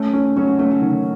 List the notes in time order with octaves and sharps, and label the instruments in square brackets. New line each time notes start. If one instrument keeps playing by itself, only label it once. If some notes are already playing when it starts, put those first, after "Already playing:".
Already playing: [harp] A3 [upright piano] C#4
[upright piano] C#4
[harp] F#3 [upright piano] C#4
[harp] F#3
[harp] A3 [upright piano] C#4
[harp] F#3
[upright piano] D#3